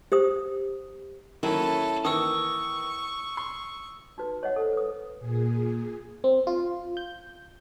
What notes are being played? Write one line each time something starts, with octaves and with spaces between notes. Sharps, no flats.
G4 C5 D#6
D#3 F#3 A#3 C#4 E4 A4
D#3 E3 A#3 C#6 D#6 E6
C6
D#4 F#4 B4
C#5 D#5 E5 F#5
A4 C5
B4 D#6
A#2 G#4
C4
F4
G6